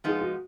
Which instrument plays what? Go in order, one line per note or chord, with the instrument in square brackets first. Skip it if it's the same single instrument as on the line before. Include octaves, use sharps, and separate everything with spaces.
[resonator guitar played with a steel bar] F3 G#3 B3 D#4 [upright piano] G#4
[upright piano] F#4